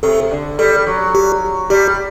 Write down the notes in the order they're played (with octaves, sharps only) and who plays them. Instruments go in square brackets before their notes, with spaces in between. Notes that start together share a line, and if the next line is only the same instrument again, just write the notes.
[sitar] C3 [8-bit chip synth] A4
[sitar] D3
[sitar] G3 [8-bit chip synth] A4
[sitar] F#3
[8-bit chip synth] G4
[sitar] G3 [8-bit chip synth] G4